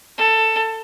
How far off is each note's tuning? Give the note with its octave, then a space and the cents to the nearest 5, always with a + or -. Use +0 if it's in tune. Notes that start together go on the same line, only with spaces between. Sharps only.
A4 +15